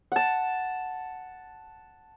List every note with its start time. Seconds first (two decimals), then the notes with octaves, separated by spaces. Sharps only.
0.12 F#5 A5